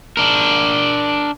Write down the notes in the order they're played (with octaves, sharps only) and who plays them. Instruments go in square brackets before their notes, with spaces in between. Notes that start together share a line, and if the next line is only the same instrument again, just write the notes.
[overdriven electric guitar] D4 A#4